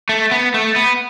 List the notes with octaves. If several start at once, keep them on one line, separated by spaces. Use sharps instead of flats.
A3
B3
A3
B3